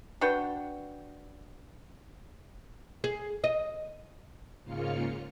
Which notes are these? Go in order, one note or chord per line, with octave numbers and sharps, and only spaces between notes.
D4 F#4 B4 G5
G#4
D#5
G#2 C#3 A#3 F4 F6 C#7